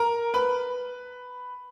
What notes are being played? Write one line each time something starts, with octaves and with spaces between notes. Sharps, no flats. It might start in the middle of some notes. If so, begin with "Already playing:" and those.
Already playing: A#4 A#5
B4 B5